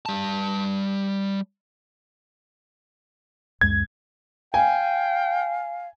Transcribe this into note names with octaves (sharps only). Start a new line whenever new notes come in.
G3 A5
C#2 F#2 G#3 G#6
F5 G5 G#5